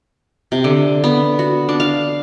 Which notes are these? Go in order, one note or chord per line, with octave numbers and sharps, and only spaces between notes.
C3
D3
B3
F#4
D4
F5